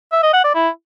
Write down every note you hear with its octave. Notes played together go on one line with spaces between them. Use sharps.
E5
D#5
F#5
D5
E4